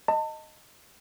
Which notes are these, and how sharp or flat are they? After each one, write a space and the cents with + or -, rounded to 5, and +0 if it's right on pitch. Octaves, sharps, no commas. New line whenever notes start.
D#5 +0 A5 +35